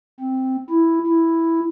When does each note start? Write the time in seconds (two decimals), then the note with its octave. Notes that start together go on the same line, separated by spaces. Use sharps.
0.20 C4
0.70 E4
1.07 E4